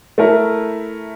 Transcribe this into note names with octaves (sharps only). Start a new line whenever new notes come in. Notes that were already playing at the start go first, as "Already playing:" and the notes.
A3 E4 A#4